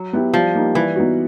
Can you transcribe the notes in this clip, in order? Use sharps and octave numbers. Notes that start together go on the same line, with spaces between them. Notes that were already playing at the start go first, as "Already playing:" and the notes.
Already playing: F#3
B3 E4 G4
F3 G3
A#3 D#4 G4
E3 G3
B3 D#4 F#4